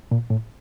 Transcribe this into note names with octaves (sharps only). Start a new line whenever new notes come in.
A#2
A2